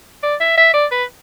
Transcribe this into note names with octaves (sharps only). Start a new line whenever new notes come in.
D5
E5
E5
D5
B4